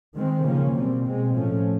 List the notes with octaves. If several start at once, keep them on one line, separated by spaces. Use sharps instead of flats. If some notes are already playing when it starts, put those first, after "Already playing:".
D#3 G#3 C4
C#3 F3 A#3 C#4
B2 G3 C4
B2 G#3 C4
A2 F3 A3 C#4